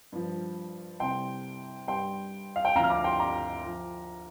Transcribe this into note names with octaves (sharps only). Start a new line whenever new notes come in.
G2 F3
C2 C3 G3 G5 C6
G2 G3 G5 C6
F5
G5
D2 D3 F3 F5 A#5
F6
A#5 D6
G5 C6
A#5 D6
F3